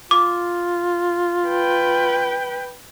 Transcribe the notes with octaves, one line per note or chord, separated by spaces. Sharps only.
F4 D6
B4 G5